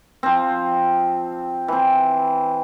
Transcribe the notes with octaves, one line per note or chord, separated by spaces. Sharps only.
F3 C4
E3 C4